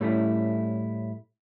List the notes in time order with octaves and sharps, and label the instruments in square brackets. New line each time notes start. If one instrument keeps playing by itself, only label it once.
[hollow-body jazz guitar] A2 G3 A3 C#4 E4